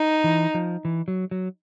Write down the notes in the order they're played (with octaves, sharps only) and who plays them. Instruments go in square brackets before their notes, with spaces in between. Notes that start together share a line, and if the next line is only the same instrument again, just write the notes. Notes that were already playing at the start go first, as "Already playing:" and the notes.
Already playing: [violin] D#4
[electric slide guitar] E3
F3
E3
F#3
F#3